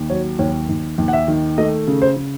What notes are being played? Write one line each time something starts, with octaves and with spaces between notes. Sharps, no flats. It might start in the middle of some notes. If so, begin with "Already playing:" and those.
Already playing: D#2
F#3 C#5
D#2 C#5
D#2
D#2
F#5
E5
D#3
A3 D#5
C#3
C5
C#3